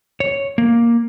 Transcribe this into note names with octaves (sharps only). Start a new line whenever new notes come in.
C#5
A#3